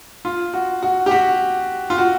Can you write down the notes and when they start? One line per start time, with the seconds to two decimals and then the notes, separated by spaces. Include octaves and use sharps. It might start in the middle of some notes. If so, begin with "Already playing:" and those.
0.25 F4
0.54 F#4
0.83 F#4
1.06 G4
1.11 F#4
1.90 F4
1.98 F#4